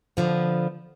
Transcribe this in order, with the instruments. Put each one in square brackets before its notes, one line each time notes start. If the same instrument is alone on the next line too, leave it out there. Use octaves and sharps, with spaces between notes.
[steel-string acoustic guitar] D3 F3 B3